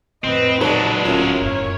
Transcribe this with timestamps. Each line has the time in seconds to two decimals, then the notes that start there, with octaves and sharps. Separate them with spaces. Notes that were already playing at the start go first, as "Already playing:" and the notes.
0.24 F2 A2 C4 B4 D#5
0.61 A#1 D#2 F#3 G#3 D#4 B4 D5 A5
1.05 D1 C#4 E4 F4 A#4
1.41 F#1 A2 C#5